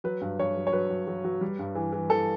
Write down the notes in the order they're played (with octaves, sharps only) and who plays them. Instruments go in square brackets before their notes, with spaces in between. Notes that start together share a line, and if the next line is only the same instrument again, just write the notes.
[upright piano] F#3 B4
G2
G2 C#5
F#3
C#5
F#3 B4
F#3
F#3
F#3
G3
G2
E3
E3
E3 A4